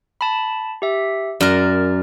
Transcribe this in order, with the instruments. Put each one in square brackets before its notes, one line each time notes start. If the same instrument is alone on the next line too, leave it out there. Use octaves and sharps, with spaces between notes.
[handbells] A5 B5
G4 E5
[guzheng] F#2 A#4 [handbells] D5 F6